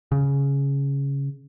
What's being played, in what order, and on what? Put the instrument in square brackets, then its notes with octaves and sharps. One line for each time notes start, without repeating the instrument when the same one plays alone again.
[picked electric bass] C#3